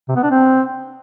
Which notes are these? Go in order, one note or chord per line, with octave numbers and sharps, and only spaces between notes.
C3
B3
D4
C4